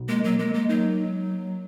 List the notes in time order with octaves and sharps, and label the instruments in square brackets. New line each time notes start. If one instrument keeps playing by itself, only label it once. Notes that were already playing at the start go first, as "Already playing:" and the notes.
Already playing: [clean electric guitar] B1
[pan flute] G#3 [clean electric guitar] A#3
[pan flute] F#3 [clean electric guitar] A#3
[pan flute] G#3 [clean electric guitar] A#3
[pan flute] G#3 [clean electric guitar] A#3
[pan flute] F#3 [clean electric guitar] D#4